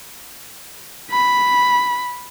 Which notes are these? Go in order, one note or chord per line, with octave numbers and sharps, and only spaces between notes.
B5